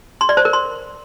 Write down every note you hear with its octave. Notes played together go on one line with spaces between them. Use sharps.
C6
D5
C5
A#4
C6